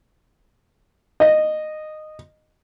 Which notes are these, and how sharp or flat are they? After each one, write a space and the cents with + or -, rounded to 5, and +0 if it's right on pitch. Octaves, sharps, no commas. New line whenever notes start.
D#5 -15